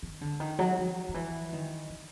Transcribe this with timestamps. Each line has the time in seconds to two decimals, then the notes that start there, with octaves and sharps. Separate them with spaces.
0.03 D#3
0.21 D3
0.40 D#3
0.59 F#3
0.77 F3
1.09 D#3
1.14 E3
1.53 D#3
1.90 D3